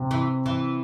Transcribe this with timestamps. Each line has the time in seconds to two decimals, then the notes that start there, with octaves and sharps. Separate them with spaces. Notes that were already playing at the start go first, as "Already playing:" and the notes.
Already playing: C3 C4
0.11 E3
0.46 E3